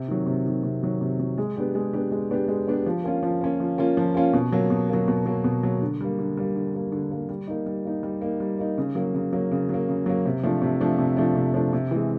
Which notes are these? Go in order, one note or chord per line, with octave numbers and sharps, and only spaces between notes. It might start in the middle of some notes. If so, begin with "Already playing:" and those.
Already playing: C3
D#3 F#3
C3
D#3 F#3
C3
D#3 F#3
C3
D#3 F#3
G#3
B3 D4 G4
G#3
B3 D4 G4
G#3
B3 D4 G4
G#3
B3 D4 G4
F3
A#3 C#4 F4
F3
A#3 C#4 F4
F3
A#3 C#4 F4
F3
A#3 C#4 F4
B2
F#3 A#3
B2
F#3 A#3
B2
F#3 A#3
B2
F#3 A#3
D3
G3 A#3
D3
G3 A#3
D3
G3 A#3
D3
G3 A#3
G3
A#3 D#4
G3
A#3 D#4
G3
A#3 D#4
G3
A#3 D#4
C#3
F#3 A#3
C#3
F#3 A#3
C#3
F#3 A#3
C#3
F#3 A#3
C3
F3 A3 D4
C3
F3 A3 D4
C3
F3 A3 D4
C3
F3 A3 D4
C3
E3 G#3